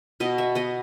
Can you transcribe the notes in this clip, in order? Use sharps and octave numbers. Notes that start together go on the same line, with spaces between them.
B2 D#5
E5
B3 D#5